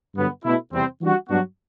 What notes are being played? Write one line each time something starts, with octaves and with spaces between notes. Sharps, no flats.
G2 D3 F#3 B3
B2 A3 E4
E2 C3 E3 G3 C4
E3 G3 D4 F#4
G2 F#3 B3 D4 F#4